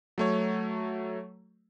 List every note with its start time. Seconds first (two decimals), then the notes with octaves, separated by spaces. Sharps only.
0.18 F#3 A3 C#5